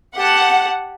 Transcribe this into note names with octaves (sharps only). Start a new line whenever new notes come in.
G4 F#5 A5